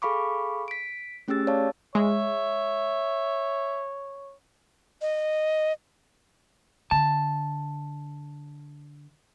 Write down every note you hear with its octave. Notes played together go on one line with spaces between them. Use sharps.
G#4 A4 F5 B5 C#6 D6
B6 D7
A3 C#4 G4 G#4 E6 A6
C#5 D5 F5 A5
G#3 C#5 E5
D#5
D3 A5